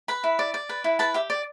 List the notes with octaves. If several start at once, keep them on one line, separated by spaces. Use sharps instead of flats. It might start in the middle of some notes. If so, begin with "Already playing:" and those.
B4 B5
E4
D5
D5
B4
E4
B4 A5
G4 E5
D5